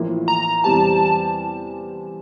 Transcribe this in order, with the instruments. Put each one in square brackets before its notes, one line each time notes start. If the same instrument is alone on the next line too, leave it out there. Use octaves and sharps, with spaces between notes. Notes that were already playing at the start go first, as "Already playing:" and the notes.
Already playing: [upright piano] A1 A2 F3 A#3 E4
[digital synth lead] A#5
[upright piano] E2 C3 G3 C4 G4 [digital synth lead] A5